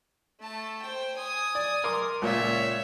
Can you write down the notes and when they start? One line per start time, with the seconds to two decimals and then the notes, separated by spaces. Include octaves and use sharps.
0.40 A3 A5
0.82 C5 G5
1.17 G#5 D#6
1.55 D5
1.84 A#4 C6 D6
2.22 C#2 A#2 C#5 E5